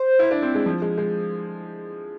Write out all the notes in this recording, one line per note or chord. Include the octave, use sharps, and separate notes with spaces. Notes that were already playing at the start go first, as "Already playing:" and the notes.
Already playing: C5
E4
D4
C4
G#3
F3
G#3
G#3